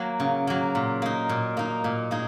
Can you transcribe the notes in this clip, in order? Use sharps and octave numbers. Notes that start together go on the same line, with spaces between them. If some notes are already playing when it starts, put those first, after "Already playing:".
Already playing: F#3 A#3
C#3
F#3 A#3
A#2
A#3 D#4
A#2
A#3 D#4
A#2
A#3 D#4 G#4